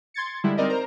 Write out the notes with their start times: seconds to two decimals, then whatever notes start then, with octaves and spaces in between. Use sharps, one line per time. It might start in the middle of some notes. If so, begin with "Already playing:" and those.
0.14 C6 G#6 A6 C#7
0.44 D3 G3 G#3 E4
0.57 G3 C4 D#4 A#4 D5 D#5
0.70 A#4 C5 A#5